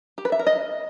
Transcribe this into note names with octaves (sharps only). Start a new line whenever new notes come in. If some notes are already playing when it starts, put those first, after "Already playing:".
G4
B4
E5
A#4
D#5